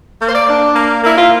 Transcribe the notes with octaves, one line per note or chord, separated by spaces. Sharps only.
A#3
C5
D5
D4
A#3
A#3 E4
F4